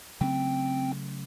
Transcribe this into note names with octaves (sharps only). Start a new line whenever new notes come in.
C#3 F#3 A3 C4 G5